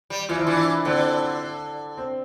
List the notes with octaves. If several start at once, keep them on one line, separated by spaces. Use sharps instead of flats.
G3
E3 F4
F3 E4
E3 D4
E4
D3 C4
C4